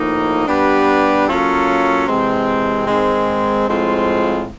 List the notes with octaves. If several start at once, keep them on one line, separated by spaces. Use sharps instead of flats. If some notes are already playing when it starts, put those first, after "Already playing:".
Already playing: A2 F3 A#3 D#4
G3 B3 D4 G4 B4
F#3 A#3 C#4 F4 A4
C3 E3 G#3 C4
G#2 D#3 G#3 C4
A2 F3 G#3 C4 F4